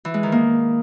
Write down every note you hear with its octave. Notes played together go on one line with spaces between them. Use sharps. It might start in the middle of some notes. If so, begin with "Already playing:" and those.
E3
G#3
D#3
A#3